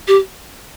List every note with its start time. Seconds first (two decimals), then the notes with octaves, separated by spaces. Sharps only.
0.08 G4